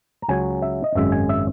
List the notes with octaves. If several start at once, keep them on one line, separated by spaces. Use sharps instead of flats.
A#5
C#2 C#3 F#3 C#4 G#5
E5
D#5
G#1 F#2 C#3 G#3 E5
G#5
E5